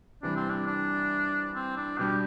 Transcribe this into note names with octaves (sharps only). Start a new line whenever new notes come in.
C3 E3 G3 D4
C4
D4
D4
C4
D4
B2 G3 D4 G4